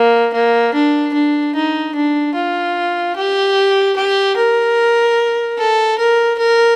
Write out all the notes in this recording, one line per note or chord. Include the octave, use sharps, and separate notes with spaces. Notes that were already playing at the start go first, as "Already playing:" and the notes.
Already playing: A#3
A#3
D4
D4
D#4
D4
F4
G4
G4
A#4
A4
A#4
A#4